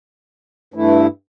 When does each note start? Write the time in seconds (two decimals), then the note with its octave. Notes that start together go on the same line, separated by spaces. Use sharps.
0.74 G2 E3 A3 E4